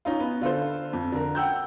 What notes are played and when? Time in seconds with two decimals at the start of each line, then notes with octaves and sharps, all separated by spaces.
0.05 C#4 D#4 F4
0.20 B3
0.41 D3 F4 A4 C5
0.93 F2
1.12 D3 A#4
1.35 F#5 G5 E6 G6